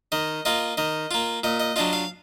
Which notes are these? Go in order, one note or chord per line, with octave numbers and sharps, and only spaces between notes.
D#3 D#5
A#3 F4 D#5
D#3 D#5
A#3 F4
A#2 D#5
D#5
F#3 D4 F4 D#5
F5